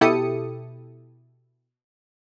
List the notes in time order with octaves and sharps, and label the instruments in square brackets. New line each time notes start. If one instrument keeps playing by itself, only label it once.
[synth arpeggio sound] B2 E4 G4 A4 D#6 C#7